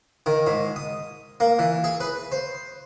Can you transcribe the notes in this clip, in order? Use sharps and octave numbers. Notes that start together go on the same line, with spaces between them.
D#3
G#2
D#6
A#3
E3
G#4
B4
C5